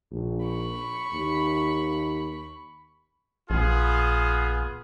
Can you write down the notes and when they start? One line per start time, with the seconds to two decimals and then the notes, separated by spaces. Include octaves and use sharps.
0.11 A#1
0.44 B5 C#6
1.13 D#2
3.50 A#1 B3 F4 G#4